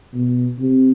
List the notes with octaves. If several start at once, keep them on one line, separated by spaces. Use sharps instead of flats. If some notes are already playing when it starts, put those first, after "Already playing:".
B2
C3